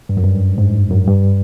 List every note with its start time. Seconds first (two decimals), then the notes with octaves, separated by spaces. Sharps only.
0.09 G2
0.17 F#2
0.24 G2
0.58 G#2
0.90 F#2
1.07 G2